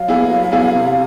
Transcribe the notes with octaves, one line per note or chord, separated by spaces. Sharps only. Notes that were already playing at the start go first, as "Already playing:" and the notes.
Already playing: F#3 F5
B3 E4 G#4
F#3
B3 E4 G#4
C3